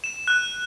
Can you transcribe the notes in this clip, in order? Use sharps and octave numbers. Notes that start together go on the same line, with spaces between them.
E7
F#6